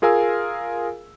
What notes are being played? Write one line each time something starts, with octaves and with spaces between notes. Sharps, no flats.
F4 G#4 A#4 F5 G#5 E6